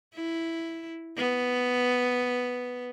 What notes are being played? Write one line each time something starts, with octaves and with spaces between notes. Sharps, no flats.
E4
B3